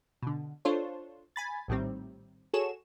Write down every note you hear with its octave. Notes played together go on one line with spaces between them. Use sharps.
B2 D3
D4 F4 A4 C5 C#5
G#5 B5 A6
A#1 A2 D#3 G3 C4
F#4 G#4 A4 C#5 E7